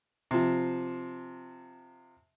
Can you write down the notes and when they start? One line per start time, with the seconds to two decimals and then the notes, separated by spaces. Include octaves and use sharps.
0.31 C3 F3